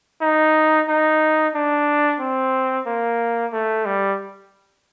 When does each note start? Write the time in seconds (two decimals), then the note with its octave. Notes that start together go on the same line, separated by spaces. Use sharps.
0.22 D#4
0.89 D#4
1.55 D4
2.20 C4
2.87 A#3
3.53 A3
3.86 G3